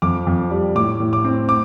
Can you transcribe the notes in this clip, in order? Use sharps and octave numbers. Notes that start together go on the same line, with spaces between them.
F2 D6
F2
G3
A2 D6
A2
D6
C4
D6